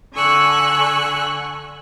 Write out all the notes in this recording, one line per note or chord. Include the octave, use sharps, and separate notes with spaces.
D3 G#5 C#6 E6 F#6